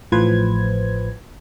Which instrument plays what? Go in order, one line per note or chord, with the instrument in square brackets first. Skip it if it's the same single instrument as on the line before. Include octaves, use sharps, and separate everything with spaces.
[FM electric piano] A1 A2 F3 B4 C5 G#6